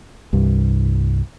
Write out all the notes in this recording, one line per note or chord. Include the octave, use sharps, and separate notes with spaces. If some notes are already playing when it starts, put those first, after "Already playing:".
C2 G2